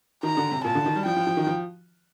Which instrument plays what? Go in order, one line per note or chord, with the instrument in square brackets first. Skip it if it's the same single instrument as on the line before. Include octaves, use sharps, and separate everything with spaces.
[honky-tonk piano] D#3 [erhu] A#5
[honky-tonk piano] D3
C3
[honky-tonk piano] A#2 [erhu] A5
[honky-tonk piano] D3
D#3
G3
[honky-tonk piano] F3 [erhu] G5
[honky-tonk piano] F3
F3
D#3
F3